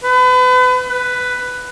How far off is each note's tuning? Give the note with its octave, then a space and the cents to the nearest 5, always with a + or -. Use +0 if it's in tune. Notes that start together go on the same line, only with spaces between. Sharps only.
B4 +35
B4 +10